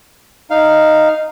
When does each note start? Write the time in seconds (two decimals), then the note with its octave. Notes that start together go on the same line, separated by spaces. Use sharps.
0.50 D#4 F5